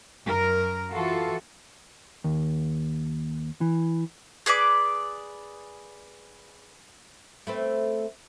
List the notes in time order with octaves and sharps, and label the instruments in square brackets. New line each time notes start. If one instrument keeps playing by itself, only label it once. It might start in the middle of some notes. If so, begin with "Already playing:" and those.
[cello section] F#2 A#4
E3 F4 F#4 A4
[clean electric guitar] D#2
E3
[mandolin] G#4 B4 D5 D6
[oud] A3 B3 C4